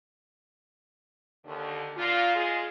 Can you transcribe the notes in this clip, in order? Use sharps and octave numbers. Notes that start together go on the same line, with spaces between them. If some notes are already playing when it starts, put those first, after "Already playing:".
D#2 D3
A#2 F4
G#3 F4 G#4